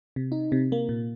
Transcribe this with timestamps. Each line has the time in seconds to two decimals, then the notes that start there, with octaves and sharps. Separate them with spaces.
0.16 C3
0.32 D#4
0.52 C3
0.72 A#3
0.89 A#2